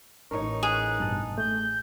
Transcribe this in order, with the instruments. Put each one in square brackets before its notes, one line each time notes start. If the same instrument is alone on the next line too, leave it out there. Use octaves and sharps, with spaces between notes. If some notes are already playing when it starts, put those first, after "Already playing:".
[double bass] A1 D#4 [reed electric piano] A#4 C#5 [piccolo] C#6
[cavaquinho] G#4 [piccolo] F#6
[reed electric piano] G2 B2 A5
[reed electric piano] A3 [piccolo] G6